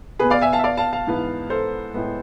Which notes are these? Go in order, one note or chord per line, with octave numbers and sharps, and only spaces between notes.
B2 B3 G#4 B4
D5 F5
E5 G#5
F5 A5
E5
D5 F5
F5 A5
F5 A5
G#2 E3 B3
A4 C5
A2 G#3 B3